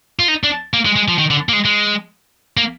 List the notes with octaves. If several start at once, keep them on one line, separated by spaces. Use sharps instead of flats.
F4
D#4
D4
A#3
G#3
G#3
F3
D#3
D3
A#3
G#3
G#3
A#3